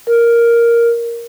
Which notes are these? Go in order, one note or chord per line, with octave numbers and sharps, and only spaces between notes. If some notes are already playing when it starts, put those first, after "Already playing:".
A#4